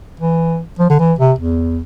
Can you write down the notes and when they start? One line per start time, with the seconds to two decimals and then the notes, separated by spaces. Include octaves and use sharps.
0.20 E3
0.79 F3
0.90 D3
0.99 E3
1.19 C3
1.39 E2